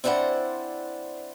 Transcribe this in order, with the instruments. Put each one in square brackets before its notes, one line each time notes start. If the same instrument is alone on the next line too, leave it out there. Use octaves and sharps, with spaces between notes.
[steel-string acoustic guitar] C4 D4 E4 C5 D5 F#5